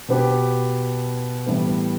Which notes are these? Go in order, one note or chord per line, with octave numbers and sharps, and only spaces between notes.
B2 B3 G4
A2 E3 G3 B3